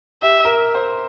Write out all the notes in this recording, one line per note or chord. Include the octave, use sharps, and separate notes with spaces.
G4 E5
A#4
C5